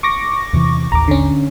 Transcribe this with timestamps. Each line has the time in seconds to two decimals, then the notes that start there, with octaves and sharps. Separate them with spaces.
0.03 C#6 D6 A#6
0.53 E2 C3 E3
0.92 A1 D#2 A#5 D6
1.08 D3 C#4